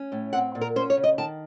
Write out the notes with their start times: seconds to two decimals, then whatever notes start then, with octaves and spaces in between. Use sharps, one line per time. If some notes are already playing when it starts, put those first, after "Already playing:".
Already playing: C#4
0.12 A2
0.33 C4 F#5
0.55 A#2
0.61 A#4
0.76 C#4 C5
0.90 C#5
0.97 C#3
1.04 D#5
1.18 D#3 A5